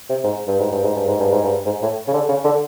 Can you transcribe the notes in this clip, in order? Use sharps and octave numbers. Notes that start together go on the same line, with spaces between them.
C3
G#2
G2
G#2
G2
G#2
G2
G#2
G2
G#2
G2
G#2
A2
C#3
D3
C#3
D3